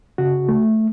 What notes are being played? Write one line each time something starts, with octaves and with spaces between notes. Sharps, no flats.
C#3 F#4
A3